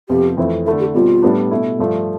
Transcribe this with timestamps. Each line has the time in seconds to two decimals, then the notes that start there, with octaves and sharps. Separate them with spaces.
0.09 F2 C3 F3 B3 G4
0.37 F2 E3 A3 C4 E4
0.66 D3 A3 E4 A4
0.80 G4
0.94 B2 G3 C4 F4
1.23 A2 G3 B3 D4
1.51 B2 A3 E4
1.79 G2 F3 A3